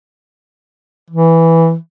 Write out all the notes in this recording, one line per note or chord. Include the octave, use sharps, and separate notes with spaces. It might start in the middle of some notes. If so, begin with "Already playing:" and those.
E3